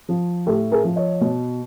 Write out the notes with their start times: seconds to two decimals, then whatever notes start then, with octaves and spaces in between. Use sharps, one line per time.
0.09 F3
0.46 A2 G4 A4
0.72 G#4 A#4
0.84 F3
0.96 C#5 D#5
1.21 B2